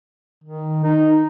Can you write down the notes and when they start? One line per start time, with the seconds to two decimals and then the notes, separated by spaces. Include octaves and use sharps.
0.44 D#3
0.84 D#4